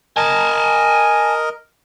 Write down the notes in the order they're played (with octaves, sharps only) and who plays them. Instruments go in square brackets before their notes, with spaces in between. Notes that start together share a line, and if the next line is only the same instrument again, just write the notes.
[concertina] A#4 D#5 [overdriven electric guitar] G#5 A5